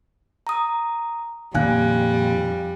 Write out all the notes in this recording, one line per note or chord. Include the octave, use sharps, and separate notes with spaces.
A#5 D#6
F2 A#2 D#3 G3 F5 G#5 F#6